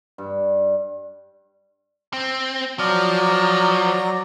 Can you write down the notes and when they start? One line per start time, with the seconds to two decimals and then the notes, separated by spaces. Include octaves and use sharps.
0.18 G2
2.13 C4
2.79 F3 F#3 D5 A#5